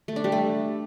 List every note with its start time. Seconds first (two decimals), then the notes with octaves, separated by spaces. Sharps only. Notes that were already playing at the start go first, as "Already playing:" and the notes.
0.08 A3
0.16 D4
0.24 G3
0.32 A3